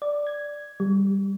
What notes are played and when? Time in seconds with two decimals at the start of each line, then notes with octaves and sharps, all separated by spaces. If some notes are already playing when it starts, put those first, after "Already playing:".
0.02 D5
0.27 G#6
0.80 G3